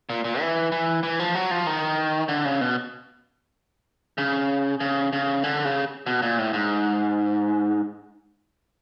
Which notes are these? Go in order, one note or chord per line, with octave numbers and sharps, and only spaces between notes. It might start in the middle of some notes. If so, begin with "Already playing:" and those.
A#2
A#2
E3
E3
E3
F3
F#3
F3
D#3
D3
C#3
B2
C#3
C#3
C#3
D3
C#3
B2
A#2
A2
G#2